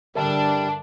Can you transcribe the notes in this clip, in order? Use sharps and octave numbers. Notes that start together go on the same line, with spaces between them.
G2 D3 G3 D4 A#4 E5 A5